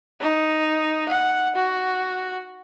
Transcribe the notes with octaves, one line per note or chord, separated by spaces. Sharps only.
D#4
F#5
F#4